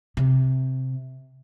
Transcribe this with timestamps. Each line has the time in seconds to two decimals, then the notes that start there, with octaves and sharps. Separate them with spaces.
0.17 C3